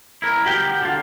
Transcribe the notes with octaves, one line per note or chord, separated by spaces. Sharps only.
E4 A#4
F#4 G4 A#4 G5
D3 F4